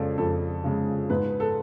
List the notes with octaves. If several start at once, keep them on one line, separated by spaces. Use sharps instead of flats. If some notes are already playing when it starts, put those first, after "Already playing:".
Already playing: F2 C#3 G#3 A4 D5
F2 A4
C#3 G#3
G#2 B4
A4